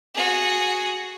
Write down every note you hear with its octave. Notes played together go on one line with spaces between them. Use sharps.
F#4 G#4